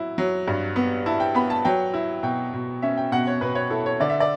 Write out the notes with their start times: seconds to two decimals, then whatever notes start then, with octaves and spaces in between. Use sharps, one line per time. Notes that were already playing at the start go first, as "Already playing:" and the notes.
Already playing: F#3 E4
0.18 F#3
0.48 G2
0.76 B3
1.06 E4 A5
1.20 G5
1.35 B3 B5
1.50 A5
1.65 F#3 G5
1.94 E4
2.23 B2 G5
2.54 B2
2.82 C#4 E5
2.97 G5
3.12 B2 F#5
3.27 C#5
3.41 B2 B4
3.55 C#5
3.70 E4 A4
3.86 C#5
4.00 D3 D5
4.10 E5
4.20 D5